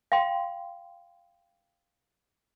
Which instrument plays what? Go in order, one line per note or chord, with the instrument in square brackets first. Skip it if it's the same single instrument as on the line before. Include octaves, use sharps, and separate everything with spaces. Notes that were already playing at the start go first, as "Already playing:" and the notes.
[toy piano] F5 G5 C6